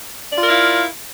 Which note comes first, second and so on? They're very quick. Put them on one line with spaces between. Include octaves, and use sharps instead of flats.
D5 F4 A#4 F5 E4